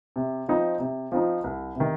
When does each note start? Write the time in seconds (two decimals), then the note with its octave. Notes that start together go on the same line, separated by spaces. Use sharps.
0.16 C3
0.48 F3 C4 D#4
0.80 C3
1.12 F3 C4 D#4
1.44 C2
1.75 C3 D#3